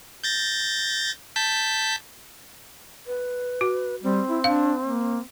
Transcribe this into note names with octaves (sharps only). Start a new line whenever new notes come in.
G6 A6 A#6
A5 G6 B6
B4
F#4
G3 C4
E4
D4 F5
A#3